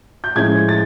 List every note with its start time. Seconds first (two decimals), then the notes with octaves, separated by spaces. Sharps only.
0.24 G6
0.35 A2 F3 G#3 C#4 G#6
0.69 A6